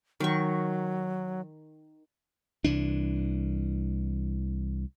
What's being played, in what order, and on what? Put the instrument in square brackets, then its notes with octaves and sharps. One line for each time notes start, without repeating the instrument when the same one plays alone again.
[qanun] D#3 C#6 [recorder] F#3
[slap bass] C2 E3 D4